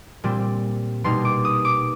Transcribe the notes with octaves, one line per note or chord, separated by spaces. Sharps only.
A#2 G3 C4
B2 G3 A#3 D#4 C6
D6
D#6
D6